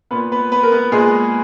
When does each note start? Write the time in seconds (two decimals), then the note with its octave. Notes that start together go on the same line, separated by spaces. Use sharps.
0.11 A#2 B3 B4
0.32 B3 B4
0.52 B3 B4
0.63 A#4
0.72 B3 B4
0.92 A#2 G#3 G#4